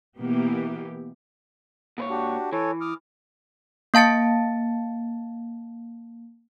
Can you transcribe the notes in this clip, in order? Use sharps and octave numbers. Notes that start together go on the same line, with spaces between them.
B2 E3 A#3 B3 G4
A#2 B4 C#5
D4 F#4 G4
E3 A4 C#5 G#5
D6 D#6 F6
A#3 F5 A5 A6 C#7